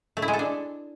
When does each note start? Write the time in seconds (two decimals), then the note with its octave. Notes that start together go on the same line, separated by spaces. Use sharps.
0.17 A3
0.22 E4
0.28 G#3
0.33 A4
0.39 D4